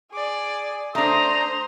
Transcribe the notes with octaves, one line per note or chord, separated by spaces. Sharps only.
G#4 D5
A3 D4 C5 A#5 C6 D#6